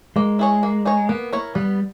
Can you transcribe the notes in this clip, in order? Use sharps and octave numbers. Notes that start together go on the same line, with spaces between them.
G#3 A#3
E4 G#4 C#5
A#3
D#4 G#4 C#5
A#3 B3
E4 A#4 C#5
G3 B3